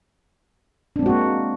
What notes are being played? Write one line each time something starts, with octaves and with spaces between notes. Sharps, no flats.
G#3 A#3 C4 D4 F#4